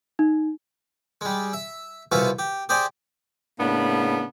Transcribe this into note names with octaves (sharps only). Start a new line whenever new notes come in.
D#4
G3 G#3
E5
C2 B2 F4 F#4 E5 G#5
G4
G4 G#4 C5 D5 G#5
A2 C#3 A#3 B3 D4